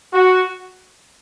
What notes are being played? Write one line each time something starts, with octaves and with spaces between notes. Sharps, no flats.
F#4